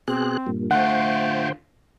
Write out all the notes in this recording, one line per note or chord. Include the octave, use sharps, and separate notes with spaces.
B2 C4 G#4 F#6
G2 A#2
D3 A3 F4 C5 F#5 G5